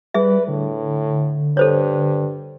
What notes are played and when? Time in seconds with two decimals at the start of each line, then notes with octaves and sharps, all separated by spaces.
0.14 G3 G#4 B4 E5
0.48 A2 D3
1.57 G2 A4 C5 C#5